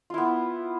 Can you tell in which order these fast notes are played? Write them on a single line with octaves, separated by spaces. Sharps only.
F4 E4 B3